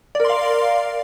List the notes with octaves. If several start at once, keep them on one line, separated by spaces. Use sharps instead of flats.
A#4 D5 F5 C6